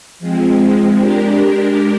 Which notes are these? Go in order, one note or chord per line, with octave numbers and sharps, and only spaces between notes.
F3 G#3 C4
G#3 D4 G4 A#4